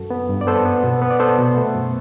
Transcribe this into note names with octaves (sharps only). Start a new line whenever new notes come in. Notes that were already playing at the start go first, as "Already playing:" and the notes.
Already playing: F#2 F#4 A4
B3
G2
D5
B3 A4 C5
B3
B2
B3
D5
B3 A4 C5
B2
A3
F#2